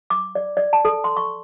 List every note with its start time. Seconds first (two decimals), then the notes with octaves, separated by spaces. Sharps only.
0.10 D6
0.35 D5
0.57 D5
0.73 A5
0.85 A4
1.04 C6
1.17 C#6